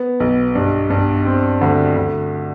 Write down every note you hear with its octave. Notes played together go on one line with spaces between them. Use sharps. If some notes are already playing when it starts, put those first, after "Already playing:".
Already playing: B3
B1
G2
G2
C4
D2
D2